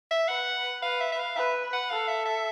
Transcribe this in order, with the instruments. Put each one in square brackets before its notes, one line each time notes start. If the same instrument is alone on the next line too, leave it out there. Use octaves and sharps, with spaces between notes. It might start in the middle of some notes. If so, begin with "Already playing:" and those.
[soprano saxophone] E5
[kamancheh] B4 [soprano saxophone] F#5
[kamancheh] B4 [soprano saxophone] F5
[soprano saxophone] E5
E5
F5
[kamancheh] B4 [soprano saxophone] E5
[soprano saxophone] F#5
[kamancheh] A4 [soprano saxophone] F5
[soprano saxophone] E5
E5